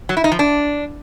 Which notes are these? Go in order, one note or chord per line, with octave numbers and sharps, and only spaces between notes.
F#3
E4
D#4
F3
D4